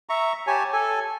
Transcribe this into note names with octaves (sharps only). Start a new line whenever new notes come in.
E5 A#5 C#6
G4 C#5 G#5 A5
A4 G#5